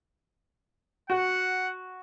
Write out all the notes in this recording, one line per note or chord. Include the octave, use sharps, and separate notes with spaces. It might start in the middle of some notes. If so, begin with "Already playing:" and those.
F#4 F#5